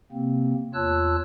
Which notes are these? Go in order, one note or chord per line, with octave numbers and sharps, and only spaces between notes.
C3 A#3 C4
E2 F4 C#5 A5 E6 F#6